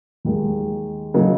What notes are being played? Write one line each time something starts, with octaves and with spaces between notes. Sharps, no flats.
D#2 D#3 G#3
C#3 F#3 A#3 D#4